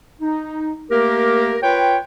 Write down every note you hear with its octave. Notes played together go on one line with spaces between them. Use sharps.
D#4
A3 A#3 G4 A#4
F4 B4 C#5 G5